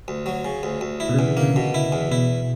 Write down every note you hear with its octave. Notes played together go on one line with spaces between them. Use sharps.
D2
F#3
C#3
D2
D2
E4
B2
E2 C#3
D3
A#3
C#3
B2
E4
E2
B2 E4